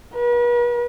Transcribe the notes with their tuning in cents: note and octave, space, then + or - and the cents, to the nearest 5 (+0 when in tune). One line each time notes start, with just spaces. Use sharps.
B4 -45